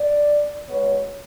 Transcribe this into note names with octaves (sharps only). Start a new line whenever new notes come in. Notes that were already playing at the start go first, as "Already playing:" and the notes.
Already playing: D5
B2 G#3 B3 C#5